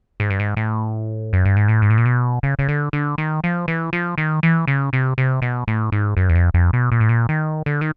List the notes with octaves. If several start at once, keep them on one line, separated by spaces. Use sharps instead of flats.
G#2
G2
G#2
A2
F#2
G2
G#2
A2
G#2
A2
A#2
B2
C#3
C#3
D3
D3
D#3
F3
E3
F3
D#3
E3
C#3
C3
C3
B2
A2
G#2
F#2
E2
F2
F2
B2
A#2
A2
A#2
D#3
D3
D#3